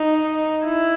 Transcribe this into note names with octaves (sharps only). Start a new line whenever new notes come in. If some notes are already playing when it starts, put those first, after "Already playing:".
Already playing: D#4
E4